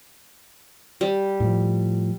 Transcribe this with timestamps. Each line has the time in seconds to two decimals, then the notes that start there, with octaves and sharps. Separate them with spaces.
1.01 G3
1.40 A2 F3